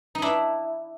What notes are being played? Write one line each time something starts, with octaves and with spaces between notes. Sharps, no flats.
D#4
D4 E4